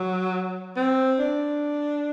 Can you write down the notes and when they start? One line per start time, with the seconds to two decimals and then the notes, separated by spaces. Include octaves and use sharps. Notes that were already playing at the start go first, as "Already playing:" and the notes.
Already playing: F#3
0.76 C4
1.19 D4